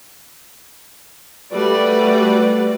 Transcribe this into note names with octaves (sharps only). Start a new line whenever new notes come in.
G3 A3 F#4 B4 D5